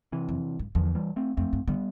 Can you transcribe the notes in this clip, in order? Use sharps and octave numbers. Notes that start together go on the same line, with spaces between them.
C3 E3
F2
G2
E2 D3 F3
E3 G3
A3 C4
F2 A3 C4
G2
D3 G3 B3